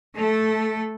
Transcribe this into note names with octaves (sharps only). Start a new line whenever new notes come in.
A3 A4